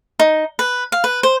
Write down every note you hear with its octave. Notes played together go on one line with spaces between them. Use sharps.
D#4
B4
F5
B4
C5